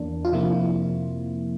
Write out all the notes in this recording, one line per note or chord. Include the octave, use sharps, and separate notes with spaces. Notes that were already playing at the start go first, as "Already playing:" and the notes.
Already playing: E2 E3 A#3 D4
F4
F2 C3 F3 A#3 E4